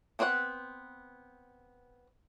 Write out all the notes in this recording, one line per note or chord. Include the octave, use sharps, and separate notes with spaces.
B3 C4 B4 C#5 F#5